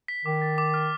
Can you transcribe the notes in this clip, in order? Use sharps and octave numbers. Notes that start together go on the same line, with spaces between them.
B6
D#3 D6
A6
D6
F6